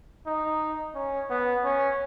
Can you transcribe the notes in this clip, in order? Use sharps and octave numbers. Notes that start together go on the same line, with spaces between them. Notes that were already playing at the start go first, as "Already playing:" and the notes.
D#4
C#4
B3
C#4